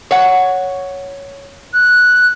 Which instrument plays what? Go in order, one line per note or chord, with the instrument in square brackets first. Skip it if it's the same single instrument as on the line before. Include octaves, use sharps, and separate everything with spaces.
[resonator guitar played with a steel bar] C#5 F#5
[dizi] F#6